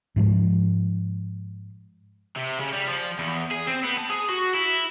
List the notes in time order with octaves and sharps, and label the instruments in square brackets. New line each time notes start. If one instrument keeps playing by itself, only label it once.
[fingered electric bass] G#2 F3 G#3
[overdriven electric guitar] C3
C#3
G3
F3
E2
G#4
C4
B3
A5
G#4
F#4
E4